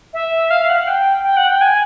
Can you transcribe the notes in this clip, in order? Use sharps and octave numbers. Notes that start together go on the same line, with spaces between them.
E5
F5
F#5
G5
G5
F#5
G5
G#5